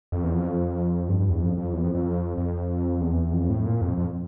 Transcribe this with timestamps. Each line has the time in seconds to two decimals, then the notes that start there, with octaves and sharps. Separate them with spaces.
0.12 F2
0.24 E2
0.34 F2
1.09 G2
1.20 G2
1.30 E2
1.41 F2
1.58 F2
1.73 E2
1.84 F2
1.94 F2
2.37 F2
3.01 E2
3.33 F2
3.50 A2
3.65 A#2
3.81 F2
3.98 F2